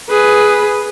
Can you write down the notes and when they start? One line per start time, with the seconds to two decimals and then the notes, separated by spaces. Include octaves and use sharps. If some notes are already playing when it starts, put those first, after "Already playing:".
0.10 G#4 B4